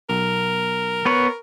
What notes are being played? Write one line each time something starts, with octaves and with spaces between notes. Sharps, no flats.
B1 A#4
B3 B4 C#5